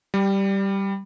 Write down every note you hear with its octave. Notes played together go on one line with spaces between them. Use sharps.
G3